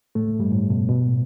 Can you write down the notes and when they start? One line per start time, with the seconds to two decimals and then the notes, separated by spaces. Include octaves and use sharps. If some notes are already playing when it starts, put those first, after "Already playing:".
0.15 A2 A3
0.39 G2 G3
0.52 A2
0.70 B2
0.89 B2
1.07 A2